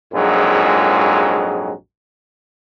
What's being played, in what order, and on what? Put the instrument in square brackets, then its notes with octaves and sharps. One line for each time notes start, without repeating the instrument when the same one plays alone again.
[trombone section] A#1 F2 G#2 F#3 G#3